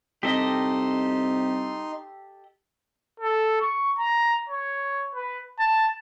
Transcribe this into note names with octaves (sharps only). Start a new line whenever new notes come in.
C2 D#4 G4 A4 D#5 C6
A4
C#6
A#5
C#5
B4
A5